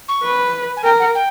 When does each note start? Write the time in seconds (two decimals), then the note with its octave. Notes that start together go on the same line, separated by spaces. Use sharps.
0.08 C#6
0.23 B4
0.77 G#5
0.84 A#4 G5
1.00 F#5
1.15 G5